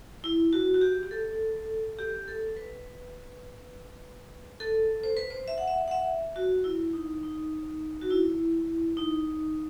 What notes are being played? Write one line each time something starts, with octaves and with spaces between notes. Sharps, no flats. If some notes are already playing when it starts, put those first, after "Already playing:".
E4
F#4
F#4
G4
G4
A4
G4
A4
B4
A4
C5
B4
C5
E5
F#5
E5
F#5
E5
F#4
E4
D#4
D#4
F#4
E4
D#4